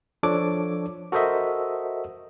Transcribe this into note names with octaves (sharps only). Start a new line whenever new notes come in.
F3 D4 A4 C#5 D6
F#4 A4 A#4 C5 D#5 E5